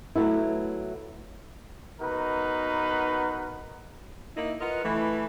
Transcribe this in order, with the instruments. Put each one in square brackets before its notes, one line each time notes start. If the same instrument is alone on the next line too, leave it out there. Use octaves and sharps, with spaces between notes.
[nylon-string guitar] F#3 A3 B3 E4
[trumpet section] B3 D#4 F#4 A#4 B4
[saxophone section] A#3 D#4 E4
F4 A#4 B4 D#5 F#5
E3 A3